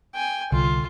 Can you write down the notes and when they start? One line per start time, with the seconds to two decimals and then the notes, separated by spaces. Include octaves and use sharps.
0.14 G5 G#5
0.52 C2 D3 F4